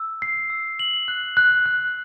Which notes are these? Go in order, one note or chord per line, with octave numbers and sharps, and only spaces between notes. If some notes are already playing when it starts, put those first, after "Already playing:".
Already playing: E6
C7
E6
F#7
F#6
F#6
F#6